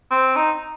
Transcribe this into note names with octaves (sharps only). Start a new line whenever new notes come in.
C4
D#4